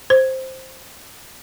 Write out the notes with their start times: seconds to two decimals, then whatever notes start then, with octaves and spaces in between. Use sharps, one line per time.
0.10 C5